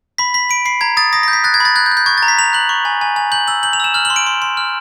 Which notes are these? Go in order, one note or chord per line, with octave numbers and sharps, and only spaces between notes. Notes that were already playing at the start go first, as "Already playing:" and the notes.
B5 B6
B5 B6
B5 D7
B5 C7
A#5 G#6
D#6 A6
D#6 A#6
A#6
G6
B6
F#6 A6
G#6
B5 A6
F#6 G#6
G6
F#6
G6
C#6 G#6
A6
A#5
B6
A#5 F7
F#6 F#7
C#6
G#5
G#5
G#5
G6 F#7
E6 F#7
G6 F#7
F7
E6 E7
F6 F#7
F#7
C6
D7
C6
C6
F6